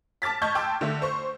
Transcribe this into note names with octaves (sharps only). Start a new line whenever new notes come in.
A5 D6 F6 A6 B6
D#5 A5 C#6 F6 G6 G#6
G5 A5 C6 D6 E6
D3 A3
C5 C#6